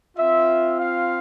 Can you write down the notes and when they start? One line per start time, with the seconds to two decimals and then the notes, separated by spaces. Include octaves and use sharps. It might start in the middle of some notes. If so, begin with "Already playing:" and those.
0.17 C4 F4 E5
0.79 F5